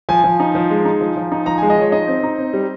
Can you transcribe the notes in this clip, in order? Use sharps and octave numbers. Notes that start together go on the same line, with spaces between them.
F3 G#5
F3
D#4
F3
G#3
D#4
F3
F3
D#4
F3 A#5
G#3 G#5
D#5
F3 C#5
D#4 D#5
C4
D#4
C4
G3